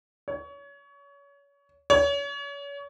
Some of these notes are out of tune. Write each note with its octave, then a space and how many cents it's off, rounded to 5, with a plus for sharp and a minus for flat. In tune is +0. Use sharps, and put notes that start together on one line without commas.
C#5 +30
C#5 +35